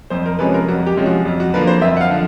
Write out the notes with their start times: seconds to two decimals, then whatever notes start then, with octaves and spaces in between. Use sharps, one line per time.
0.10 F2 C5
0.26 A#4
0.39 C3 F3 G#3 C#4 B4
0.54 A#4
0.68 F2 F#4
0.86 G4
0.97 C3 F3 G#3 C#4
1.06 F#4
1.25 F2
1.40 F#4
1.54 D3 F3 A#3 B4
1.67 C5
1.82 F2 E5
1.97 F#5
2.01 F5
2.10 D3 F3